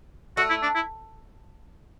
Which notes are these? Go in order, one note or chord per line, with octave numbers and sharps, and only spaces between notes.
A3 F#4
E4
D4
E4